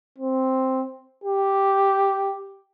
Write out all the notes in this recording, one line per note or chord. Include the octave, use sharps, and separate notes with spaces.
C4
G4